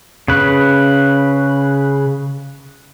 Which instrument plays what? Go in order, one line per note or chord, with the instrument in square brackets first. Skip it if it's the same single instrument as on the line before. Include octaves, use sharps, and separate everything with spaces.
[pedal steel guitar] C#3 B4